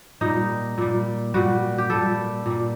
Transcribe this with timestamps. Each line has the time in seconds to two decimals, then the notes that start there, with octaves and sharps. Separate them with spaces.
0.21 A#2 G3 D#4
0.78 A#2 G3
1.34 A#2 G3 F#4
1.78 G4
1.90 A#2 G3 A4
2.46 A#2 G3